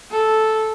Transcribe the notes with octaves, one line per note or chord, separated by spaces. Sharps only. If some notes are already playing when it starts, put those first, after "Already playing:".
A4